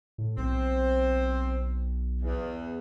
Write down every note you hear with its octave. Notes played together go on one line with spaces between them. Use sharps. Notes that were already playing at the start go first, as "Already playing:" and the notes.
A2
B1 C4 C5
E2